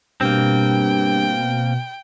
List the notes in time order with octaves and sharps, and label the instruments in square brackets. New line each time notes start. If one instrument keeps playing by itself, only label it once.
[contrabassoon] G2 [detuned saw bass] B2 [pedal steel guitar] A#3 C4 [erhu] G5